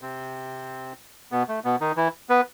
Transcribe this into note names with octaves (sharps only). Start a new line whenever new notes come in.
C3 C4
B2 B3
A3
B2 B3
D#3 D#4
E3 E4
B3 B4